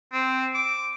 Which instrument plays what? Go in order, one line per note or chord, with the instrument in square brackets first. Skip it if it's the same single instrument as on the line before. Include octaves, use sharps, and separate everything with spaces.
[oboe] C4
D6